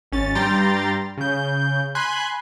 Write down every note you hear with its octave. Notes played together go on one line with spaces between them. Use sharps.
G#1 C#4 A6
G2 G3 G5 A#5 C6 A6
C#3 G6
G#5 B5 C6 F#6 G#6